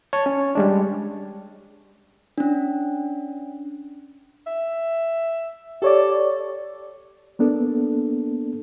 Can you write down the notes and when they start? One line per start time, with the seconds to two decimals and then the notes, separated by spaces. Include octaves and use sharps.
0.13 C#5 A5
0.26 C#4
0.55 G3 G#3 D4
2.38 C#4 D4
4.46 E5
5.82 G4 A4 C#5 D5
7.39 A#3 B3 D4 A4